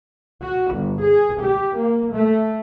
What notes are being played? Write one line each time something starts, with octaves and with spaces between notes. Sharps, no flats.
F#4
G1
G#4
G4
A#3
A3